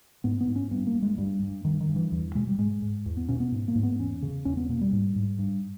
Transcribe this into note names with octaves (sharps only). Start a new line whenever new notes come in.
G#2 B3
B3
G#2
C#4
G2 B3
A#3
G2
G#3
G2 G3
G2
G2 D#3
D#3
G2
E3
E2 E3
B2 G#3
G3
G#2 G#3
G#2
E2
B3
B2 C#4
B3
G#2
A#3
G#2
B3
E2 C#4
C#3
E2 C#4
B3
B2 A#3
G3
G#2
G#2
G2